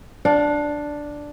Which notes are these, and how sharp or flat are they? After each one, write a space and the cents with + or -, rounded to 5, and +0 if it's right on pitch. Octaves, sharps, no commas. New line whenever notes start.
D4 +0 F5 +35